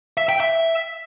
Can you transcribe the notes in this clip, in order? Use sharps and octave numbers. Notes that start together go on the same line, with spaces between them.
E5
G5
E5